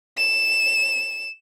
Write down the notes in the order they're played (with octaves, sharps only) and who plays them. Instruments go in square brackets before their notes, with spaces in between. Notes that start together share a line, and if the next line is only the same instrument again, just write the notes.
[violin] E7